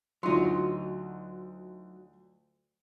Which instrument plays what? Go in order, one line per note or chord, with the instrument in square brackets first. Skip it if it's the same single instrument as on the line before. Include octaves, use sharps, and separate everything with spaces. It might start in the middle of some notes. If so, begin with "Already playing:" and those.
[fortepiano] D2 F4 C6 [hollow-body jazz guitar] F#3 D#4